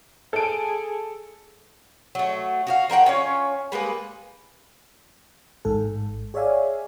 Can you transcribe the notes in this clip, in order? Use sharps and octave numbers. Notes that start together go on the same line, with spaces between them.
G#4 A4 D7
F#3 A3
F#4 G4 F5
F3 A#4 F#5 G5
C#4 F4 C#5
G3 G#3 A#3 B4
A1 G#2 A4
G#4 C#5 D5 E5 F5 G#5